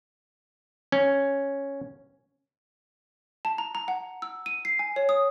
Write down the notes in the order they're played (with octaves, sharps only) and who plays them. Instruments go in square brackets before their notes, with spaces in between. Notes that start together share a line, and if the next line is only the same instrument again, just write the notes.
[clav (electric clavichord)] C#4
[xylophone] A5
A#5
A#5
F#5
E6
D#7
C7
G#5
C#5
D#6